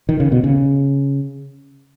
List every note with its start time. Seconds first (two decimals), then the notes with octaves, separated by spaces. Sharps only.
0.09 D#3
0.20 C#3
0.32 B2
0.44 C#3